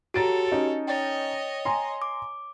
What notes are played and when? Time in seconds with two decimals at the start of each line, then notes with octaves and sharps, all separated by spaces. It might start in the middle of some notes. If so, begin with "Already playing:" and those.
0.14 F#4 G4 A4 C#5 A#5 A6 D7
0.52 C#4 D#4
0.87 C#5 D#5 G5 A6
1.65 G#5 A#5 C6
2.02 D6